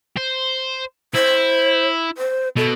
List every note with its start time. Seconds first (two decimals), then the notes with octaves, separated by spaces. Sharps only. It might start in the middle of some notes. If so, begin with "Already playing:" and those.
0.17 C5
1.14 E4 C5
2.18 C5
2.57 B2 A4